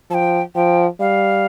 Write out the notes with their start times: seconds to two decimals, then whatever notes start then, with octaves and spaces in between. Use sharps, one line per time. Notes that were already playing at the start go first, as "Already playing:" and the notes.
0.11 F3 G5 A5
0.55 F3 G5
1.00 G3 F5